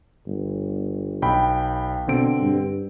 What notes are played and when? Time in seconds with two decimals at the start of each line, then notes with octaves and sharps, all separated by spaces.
0.26 G1
1.22 B1 G5 B5
2.08 B2 D3 C4 D7
2.40 G2